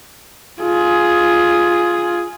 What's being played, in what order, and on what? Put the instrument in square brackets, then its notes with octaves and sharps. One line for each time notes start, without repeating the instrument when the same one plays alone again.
[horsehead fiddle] F4 G#4